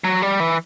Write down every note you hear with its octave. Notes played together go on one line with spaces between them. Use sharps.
F#3
G3
E3